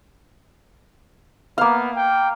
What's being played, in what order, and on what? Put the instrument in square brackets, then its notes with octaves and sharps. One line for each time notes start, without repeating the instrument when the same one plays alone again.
[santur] A#3 F5 [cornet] B3
[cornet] G5